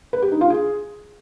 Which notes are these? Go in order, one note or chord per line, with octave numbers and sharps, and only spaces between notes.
B4
G4
D#4
F4
G#4